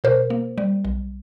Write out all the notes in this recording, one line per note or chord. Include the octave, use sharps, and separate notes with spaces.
B2 A#4 C5
A#3
G3
B1